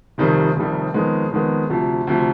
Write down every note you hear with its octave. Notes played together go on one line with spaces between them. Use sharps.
F1 F2 C3 D#3 G3
F1 F2 C3 D#3 G3
F2 D#3 G#3 B3
F2 D#3 G#3 B3
D2 C3 F3
D2 C3 F3